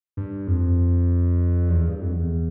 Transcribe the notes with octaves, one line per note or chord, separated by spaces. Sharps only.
G2
F2
E2
G2
F2
E2